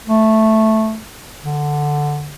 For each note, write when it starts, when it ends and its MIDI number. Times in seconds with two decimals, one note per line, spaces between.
0.07 0.99 57
1.43 2.35 50